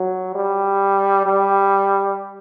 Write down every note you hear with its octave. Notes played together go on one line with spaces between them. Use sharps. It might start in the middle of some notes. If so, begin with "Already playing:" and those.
Already playing: F#3
G3
G3